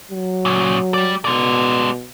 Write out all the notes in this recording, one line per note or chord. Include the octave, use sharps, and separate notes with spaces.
F#3
A#2 C#3
G3 D5
B2 G#3 D5